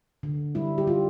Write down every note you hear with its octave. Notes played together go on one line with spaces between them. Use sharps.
D3
G3 E4
G4
G3 F4